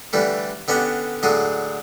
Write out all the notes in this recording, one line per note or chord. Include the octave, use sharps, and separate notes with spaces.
D3 E3 G3 A3
D3 B3 C#4 D4 G4
A2 D3 F#3 G#3 D#6